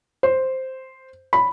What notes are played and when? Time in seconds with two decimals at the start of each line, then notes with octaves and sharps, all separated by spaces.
0.23 C5
1.33 B5